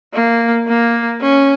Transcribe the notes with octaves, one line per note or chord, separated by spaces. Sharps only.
A#3
A#3
C#4